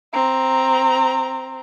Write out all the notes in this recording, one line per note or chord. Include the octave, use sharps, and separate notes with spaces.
C4 A#5